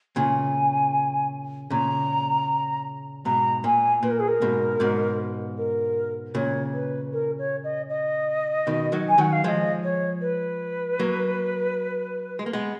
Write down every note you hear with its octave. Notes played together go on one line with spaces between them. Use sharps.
A#2 C#3 G#5
A#2 C#3 A#5
G#2 B2 A#5
A#2 G#5
A#2 B4
A#4
G#4
A#4
G#2 B2
G#2 B2
A#4
A#2 C#3 C#5
B4
A#4
C#5
D#5
D#5
B2 D#3
D#3 F#3
G#5
D#3 F#3 F#5
F5
F3 G#3 D#5 F5
C#5
B4
F#3 A#3
G#3
A#3
G#3 B3